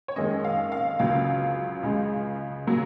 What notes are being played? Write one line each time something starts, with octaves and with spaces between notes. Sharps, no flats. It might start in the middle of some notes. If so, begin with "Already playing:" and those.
C#5
F#2 D#3 G#3 C#4 D#5
F5
F5
C#2 C#3 F#3 F5
C#2 C#3 G#3
C#3 F#3 A#3